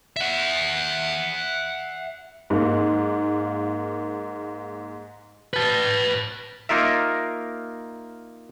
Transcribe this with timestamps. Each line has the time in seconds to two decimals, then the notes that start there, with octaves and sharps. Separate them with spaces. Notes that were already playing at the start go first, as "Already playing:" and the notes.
0.17 E5 F#5
2.50 G#2 A#3
5.54 B4 A5
6.69 A#3 D#4 F4 A#4 E5